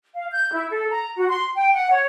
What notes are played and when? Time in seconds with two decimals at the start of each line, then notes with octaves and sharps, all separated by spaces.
0.15 F5
0.32 G6
0.53 E4
0.70 A4
0.91 A#5
1.17 F#4
1.29 C6
1.55 G5
1.74 F#5
1.90 C#5